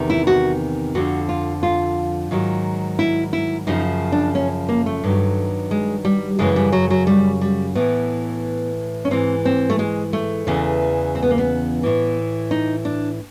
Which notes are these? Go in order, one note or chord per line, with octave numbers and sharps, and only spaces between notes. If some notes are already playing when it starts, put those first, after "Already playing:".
Already playing: E2 C3 D#3
E4
F#4
F2 D3 F3 F#4
F4
F4
G#2 D#3 F#3
E4
E4
F#2 C#3 F3 D#4
D4
C#4
A#3
A3
G2 D#3 F#3
G#3
G3
F#2 C#3 E3 G#3
G3
F#3
F#3
G3
G3
A2 E3 B3
C#4
G#2 E3 C4
C4
A3
G#3
A3
E2 C#3 E3
C4
B3
A#3
B3
A2 E3
D#4
D4